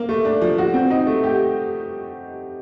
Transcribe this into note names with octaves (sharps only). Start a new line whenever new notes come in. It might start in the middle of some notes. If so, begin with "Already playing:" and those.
Already playing: A#3
A3
D4
F3
F#4
C4
D#4
A3
G4